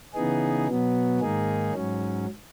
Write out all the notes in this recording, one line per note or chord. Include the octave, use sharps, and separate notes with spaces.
C#3 E3 B3 D#4 G#4
B2 F#3 B3
G#2 D#3 A#3 D#4 G#4
G#2 F#3 C#4